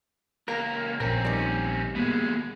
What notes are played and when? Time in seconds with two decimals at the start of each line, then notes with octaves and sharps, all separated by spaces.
0.48 C#2 A#3 A#4
1.00 A#1 A#2 C4 C#4 A#4
1.25 D#3 G3
1.96 B2 G#3 A#3 B3